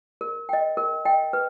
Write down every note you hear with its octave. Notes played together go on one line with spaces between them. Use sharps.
A#4
D#5 G5
A#4
D#5 G5
B4